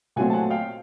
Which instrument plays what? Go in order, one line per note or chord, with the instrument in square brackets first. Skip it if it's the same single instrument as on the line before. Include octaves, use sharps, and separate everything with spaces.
[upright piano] A#2 F#3 A3 C4 F#5 G#5
A5
F#5 G#5
F5 G5